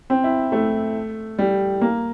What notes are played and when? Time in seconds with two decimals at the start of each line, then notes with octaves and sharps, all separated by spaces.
0.10 C4
0.24 E4
0.52 A3
1.39 G3
1.81 A#3